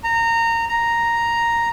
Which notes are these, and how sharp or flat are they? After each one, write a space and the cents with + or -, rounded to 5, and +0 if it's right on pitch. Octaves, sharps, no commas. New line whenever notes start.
A#5 -20
A#5 +0